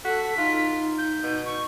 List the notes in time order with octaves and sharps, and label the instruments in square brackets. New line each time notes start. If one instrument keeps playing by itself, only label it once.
[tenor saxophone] F#4 [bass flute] A4 [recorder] B6
[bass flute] D#4 [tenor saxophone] F4
[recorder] G6
[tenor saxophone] B2
[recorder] C#6